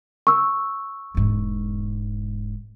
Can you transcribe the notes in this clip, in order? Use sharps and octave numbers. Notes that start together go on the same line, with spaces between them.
C#6 E6
E1 G#2